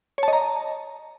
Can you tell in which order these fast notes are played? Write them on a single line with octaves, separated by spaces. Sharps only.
C#5 A5 D#5 A#5